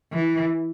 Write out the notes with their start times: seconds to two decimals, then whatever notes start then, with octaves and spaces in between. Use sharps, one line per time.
0.12 E3